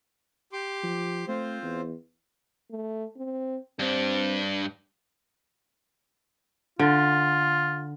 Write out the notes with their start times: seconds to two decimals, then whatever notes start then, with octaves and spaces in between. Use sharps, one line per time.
0.53 G4 C6 D6
0.83 F3
1.28 A3 C4 F4 C5
1.62 E2
2.71 A3
3.16 C4
3.79 G2 C4 D4
6.79 D3 F4